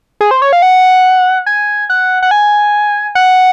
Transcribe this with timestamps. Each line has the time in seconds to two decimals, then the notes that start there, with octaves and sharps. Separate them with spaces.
0.21 G#4
0.31 C5
0.42 C#5
0.53 F5
0.62 F#5
1.46 G#5
1.90 F#5
2.22 F#5
2.31 G#5
3.15 F#5